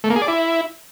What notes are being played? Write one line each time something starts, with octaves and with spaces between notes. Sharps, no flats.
A3
A#3
G#4
D5
E4